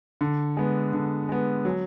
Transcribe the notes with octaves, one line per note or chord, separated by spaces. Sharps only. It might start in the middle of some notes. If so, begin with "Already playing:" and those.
D3
G#3 B3
D3
G#3 B3
F#3